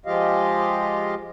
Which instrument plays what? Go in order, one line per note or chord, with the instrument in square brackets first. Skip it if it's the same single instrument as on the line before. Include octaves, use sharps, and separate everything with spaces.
[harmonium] F3 G#3 F4 G4 D#5 F5